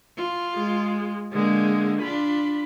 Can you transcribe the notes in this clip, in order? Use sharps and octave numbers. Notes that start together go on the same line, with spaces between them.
F4
G#3
D3 G#3 A#3
D4 F4 B5